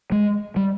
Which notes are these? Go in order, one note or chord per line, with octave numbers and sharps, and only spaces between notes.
G#3
G3